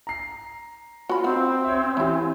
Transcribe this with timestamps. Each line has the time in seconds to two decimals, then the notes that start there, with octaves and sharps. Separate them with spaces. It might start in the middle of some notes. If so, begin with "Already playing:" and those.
0.07 A#5 C7
1.09 F4 F#4 B5
1.24 C4 D#4 F#4
1.64 C#5 E5
1.97 E3 C#4 E4 G4